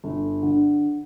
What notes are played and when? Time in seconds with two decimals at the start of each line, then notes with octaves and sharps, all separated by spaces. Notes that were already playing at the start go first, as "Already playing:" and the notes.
0.04 G1
0.43 D3